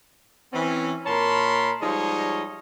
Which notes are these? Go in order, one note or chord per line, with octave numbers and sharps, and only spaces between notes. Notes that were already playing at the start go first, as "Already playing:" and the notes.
E3 C4 C#4
A#2 A#4 C#5 A5 B5 C6
F3 G3 G#3 D#4 C#5 D#5